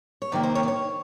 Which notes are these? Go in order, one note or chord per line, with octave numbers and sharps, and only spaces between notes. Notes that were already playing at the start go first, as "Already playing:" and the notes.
C#5
F2 C3 D#3 A#3 D5
C5
C#5
D5
C#5